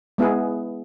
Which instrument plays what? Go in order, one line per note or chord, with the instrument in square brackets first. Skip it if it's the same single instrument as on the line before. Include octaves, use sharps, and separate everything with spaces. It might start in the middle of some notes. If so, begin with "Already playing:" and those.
[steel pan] G#3 B3 E4 G#4